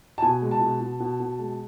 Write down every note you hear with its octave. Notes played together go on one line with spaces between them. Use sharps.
A5
B2 G#5
G#3
A5
B2
B2
B2
B2
G#3